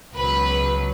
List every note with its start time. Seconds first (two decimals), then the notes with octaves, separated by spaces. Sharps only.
0.14 C#2 B2 F#3 B4